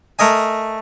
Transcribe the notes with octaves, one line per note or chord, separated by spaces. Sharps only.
A3 A#4 D#5 G#5